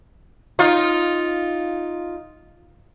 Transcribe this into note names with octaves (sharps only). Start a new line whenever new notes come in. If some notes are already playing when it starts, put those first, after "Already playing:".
D#4 F4